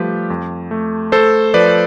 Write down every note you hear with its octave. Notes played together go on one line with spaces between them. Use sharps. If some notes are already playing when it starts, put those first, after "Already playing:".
Already playing: F3 G3 A3 G4 B4
F2
A3
A3 A4 C5
F3 B4 D5